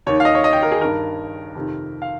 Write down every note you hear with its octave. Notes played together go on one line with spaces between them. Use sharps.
D#2 D#3 C#5
F5
D#5
C#5
D#5
G5
A#4
G#4
G2 D#3 A#4
F2 C3 D#3
F5